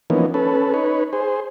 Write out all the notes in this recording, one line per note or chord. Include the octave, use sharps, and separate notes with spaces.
E3 F3 A#3 B3 C#4 D#4
C#4 A4 B4
D#4 B4 C#5
G#4 C5